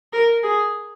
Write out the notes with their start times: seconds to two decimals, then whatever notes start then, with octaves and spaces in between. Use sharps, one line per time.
0.13 A#4
0.43 G#4